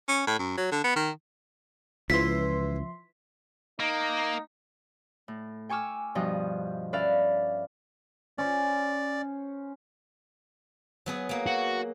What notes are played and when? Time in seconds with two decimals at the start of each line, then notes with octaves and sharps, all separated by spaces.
0.09 C#4
0.27 A2
0.39 F#2
0.58 F#3
0.71 D3
0.84 B3
0.96 D#3
2.10 C#2 E3 F3 E4 E5 C6 B6
3.80 A#3 D#4
5.28 A2
5.69 G5 G#5 C#6 D6 E6 F6
6.15 G2 B2 F3 D#5 G5
6.93 C#4 B4 D5 E5 F5
8.38 C#4 C5 D5
11.06 F#3 B3 G#4
11.29 F#3 A#3
11.46 F#4